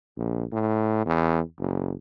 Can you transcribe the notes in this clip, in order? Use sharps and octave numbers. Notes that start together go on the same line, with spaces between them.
A#1
A2
E2
F#1